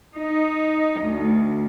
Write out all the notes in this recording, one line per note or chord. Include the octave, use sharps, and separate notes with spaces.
D#4
D2